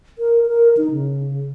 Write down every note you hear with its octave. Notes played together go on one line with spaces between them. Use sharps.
A#4
A#4
D#4
C#3